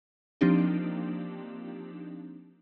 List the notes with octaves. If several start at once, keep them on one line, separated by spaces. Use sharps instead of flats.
F3 A#3 C4 D4 D#4 G4